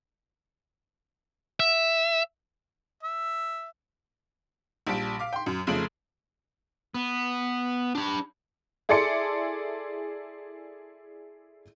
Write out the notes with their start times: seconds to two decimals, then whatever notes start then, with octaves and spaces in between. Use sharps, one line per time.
1.60 E5
3.03 E5
4.87 A#1 G3 A5 B6 D7
5.19 F5 D6
5.33 G5 C6
5.46 F#2
5.67 F1 C#3 F3 A3 D7 F#7
6.94 B3
7.95 D4 B5
8.89 E4 G#4 A4 D5 C6 C#7